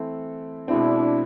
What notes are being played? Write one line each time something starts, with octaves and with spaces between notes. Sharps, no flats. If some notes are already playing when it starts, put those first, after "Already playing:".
Already playing: E3 A3 C4 E4 A4
B2 G#3 C4 D4 E4